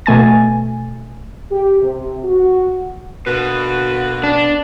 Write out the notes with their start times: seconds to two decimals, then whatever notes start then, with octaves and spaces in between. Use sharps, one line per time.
0.06 B2 A3 G#5 A6
1.51 G4
1.82 C3
2.24 F#4
3.27 B2 D3 A#3 F#4 B4
4.24 D4